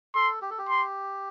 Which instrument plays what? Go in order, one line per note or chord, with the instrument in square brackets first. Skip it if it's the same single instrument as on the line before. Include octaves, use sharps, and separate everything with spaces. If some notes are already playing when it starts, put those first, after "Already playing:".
[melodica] A4 [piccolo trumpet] C6
[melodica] G4
A4
G4
[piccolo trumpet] C6